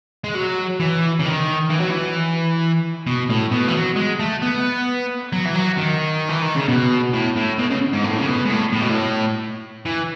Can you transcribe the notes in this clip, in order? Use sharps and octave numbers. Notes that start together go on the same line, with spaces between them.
G#3
F#3
E3
C#3
D#3
E3
F#3
E3
B2
A2
B2
E3
F#3
G#3
A3
B3
F#3
E3
F#3
D#3
E3
D#3
C#3
B2
A2
A2
B2
C#3
G#2
A2
C#3
B2
G#2
A2
A2
B2
A2
E3